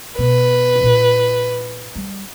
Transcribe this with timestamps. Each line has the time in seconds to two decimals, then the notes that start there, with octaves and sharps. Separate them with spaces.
0.18 B2 B4
0.81 A#2 E4
1.96 G3